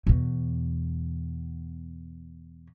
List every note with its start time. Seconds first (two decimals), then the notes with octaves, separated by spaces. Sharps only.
0.07 E2 B2